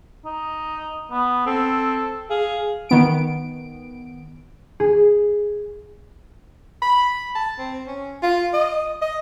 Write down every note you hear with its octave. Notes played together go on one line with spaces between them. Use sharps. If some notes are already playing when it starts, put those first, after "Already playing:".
D#4
B3
C4 A4
G#4 F5
D#3 B3 D7
G#4
B5
A5
C4
C#4
F4
D#5
D#5